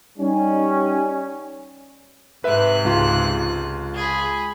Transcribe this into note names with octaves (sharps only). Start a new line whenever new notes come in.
G3 C#4 D#4
G#2 C3 B4 E5 F#6
C#2 F4 C6
G#4 B5